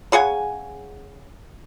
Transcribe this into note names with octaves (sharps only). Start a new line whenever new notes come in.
C#3 G#4 F#5 G#5